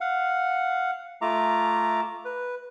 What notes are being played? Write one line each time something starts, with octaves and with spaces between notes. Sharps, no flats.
F5 F#5
A3 F4 E5 A#5 D6
B4